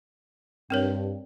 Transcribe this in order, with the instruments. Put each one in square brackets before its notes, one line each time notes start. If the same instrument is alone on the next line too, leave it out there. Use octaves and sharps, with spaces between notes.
[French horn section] G2 [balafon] C4 A#4 C#5